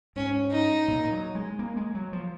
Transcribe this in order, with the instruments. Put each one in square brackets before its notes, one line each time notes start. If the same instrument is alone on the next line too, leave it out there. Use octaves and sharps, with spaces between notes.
[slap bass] G#2 [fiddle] C#4
[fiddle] D#4
[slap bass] A#2
F#3
G#3
A#3
G#3
F#3
F3